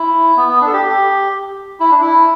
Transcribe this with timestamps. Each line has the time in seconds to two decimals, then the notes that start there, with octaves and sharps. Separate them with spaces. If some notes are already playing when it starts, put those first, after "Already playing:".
Already playing: E4
0.37 B3
0.48 B3
0.61 D4
0.67 A4
0.73 G4
0.85 G4
1.80 E4
1.91 D4
2.02 E4